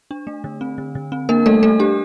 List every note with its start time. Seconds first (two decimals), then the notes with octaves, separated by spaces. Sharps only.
0.11 D4
0.27 A3
0.44 D3
0.61 C4
0.78 D3
0.95 D3
1.12 C4
1.29 A#3 D4 A#4
1.46 G3 A3 A4
1.63 G3 A3 A4
1.79 D4 G4